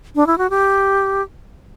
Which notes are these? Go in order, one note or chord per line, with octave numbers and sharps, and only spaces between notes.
D4
E4
F#4
G4